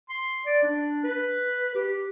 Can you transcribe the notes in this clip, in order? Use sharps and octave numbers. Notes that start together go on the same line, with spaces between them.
C6
D5
D4
B4
G4